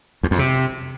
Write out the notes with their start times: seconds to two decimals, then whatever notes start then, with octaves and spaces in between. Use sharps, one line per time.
0.23 E2
0.31 F2
0.39 C3